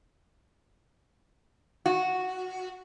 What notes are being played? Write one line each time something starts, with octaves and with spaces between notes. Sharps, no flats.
F#4